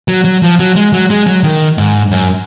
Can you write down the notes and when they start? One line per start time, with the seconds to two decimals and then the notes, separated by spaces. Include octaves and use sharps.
0.08 F#3
0.25 F#3
0.42 F3
0.59 F#3
0.76 G#3
0.93 F#3
1.10 G#3
1.27 F#3
1.43 D#3
1.78 G#2
2.11 F#2